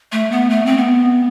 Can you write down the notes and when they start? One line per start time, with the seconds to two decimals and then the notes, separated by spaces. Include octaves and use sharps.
0.12 A3
0.32 B3
0.50 A3
0.66 C4
0.78 B3